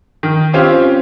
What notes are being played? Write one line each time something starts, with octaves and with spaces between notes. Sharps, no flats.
D#3
C4 C#4 F4 G4